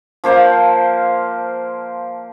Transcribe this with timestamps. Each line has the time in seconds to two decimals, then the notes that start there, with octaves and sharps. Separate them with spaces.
0.24 F3 A#3 C5 F5